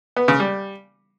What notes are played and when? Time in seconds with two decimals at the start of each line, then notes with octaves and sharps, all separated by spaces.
0.16 B3
0.28 C#3
0.40 G3